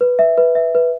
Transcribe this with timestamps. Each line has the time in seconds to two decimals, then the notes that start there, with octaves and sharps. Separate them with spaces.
0.01 B4
0.19 E5
0.38 B4
0.55 E5
0.75 B4